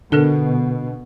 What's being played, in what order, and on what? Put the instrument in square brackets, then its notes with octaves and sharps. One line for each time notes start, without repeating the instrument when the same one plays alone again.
[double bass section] B2 [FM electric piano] D3 [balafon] D4 A4 A#4